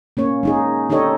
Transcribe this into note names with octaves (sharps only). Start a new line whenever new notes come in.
A#3 C#4 C#5
G#3 D#4 G#4
D4 D#4 G4 A4 C#5 D#5